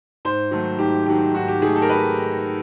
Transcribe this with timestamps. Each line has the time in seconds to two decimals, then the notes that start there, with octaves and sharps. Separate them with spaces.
0.25 G#2 C5
0.51 D#3 F#3 A3
0.79 G#2 G4
1.06 D#3 F#3 A3 G4
1.34 G#2 F#4
1.48 G4
1.62 D#3 F#3 A3 G#4
1.76 A4
1.82 A#4
1.90 B4